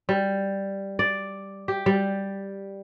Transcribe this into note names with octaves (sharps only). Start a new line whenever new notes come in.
G3
D5
G4
G3